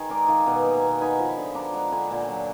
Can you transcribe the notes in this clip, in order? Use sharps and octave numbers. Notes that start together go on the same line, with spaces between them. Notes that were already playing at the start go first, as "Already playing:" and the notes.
Already playing: D#3 G#4
G#3 A#4 D5
D#3 D5 F5
B2 D#5 F#5
A#3 G#5
F#5 A#5
B2
D#4 G#5 B5
F3
G#5 B5
D3
D4 A#5 D6
G#3 F#5 A#5
D3 G#5 B5
A#2
F#3